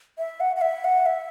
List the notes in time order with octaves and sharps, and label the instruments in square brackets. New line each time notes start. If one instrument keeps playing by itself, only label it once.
[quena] E5
F#5
F#5
E5
F#5
E5